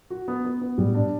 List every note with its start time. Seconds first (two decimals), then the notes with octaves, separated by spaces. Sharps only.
0.10 F#4
0.28 B3
0.45 B3
0.61 B3
0.78 A2 G3
0.95 D4